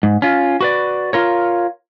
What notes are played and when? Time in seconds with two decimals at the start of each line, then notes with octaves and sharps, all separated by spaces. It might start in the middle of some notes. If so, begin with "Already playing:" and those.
0.03 G#2
0.22 C#4 F4
0.61 F#4 B4 D5
1.13 F4 A#4 C#5